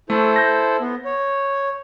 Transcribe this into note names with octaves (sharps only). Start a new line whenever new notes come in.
A3 E4 A4 C5
G6 A#6
B3
C#5